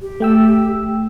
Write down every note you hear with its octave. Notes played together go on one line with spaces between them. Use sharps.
G4
A3 G5 E6